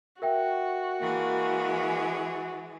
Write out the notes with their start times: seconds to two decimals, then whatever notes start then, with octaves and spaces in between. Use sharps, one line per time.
0.22 F#4 A#4 E5 G5
1.02 E3 G#3 A#3 G#4